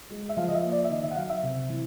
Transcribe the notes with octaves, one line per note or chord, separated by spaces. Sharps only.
G#3
E5
F3 F5
D#5
E5
A#3
D5
E5
D#3 D#5
E5
F#5
F#3 F5
E5
C3
E3